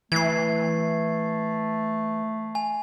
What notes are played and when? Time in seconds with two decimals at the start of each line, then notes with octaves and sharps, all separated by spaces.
0.12 E3 A3 G#6 C7
2.55 G#5